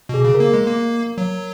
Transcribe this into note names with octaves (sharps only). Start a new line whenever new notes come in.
B2 G#4
C#3
A#4
A#3
G#3
A#3
F#3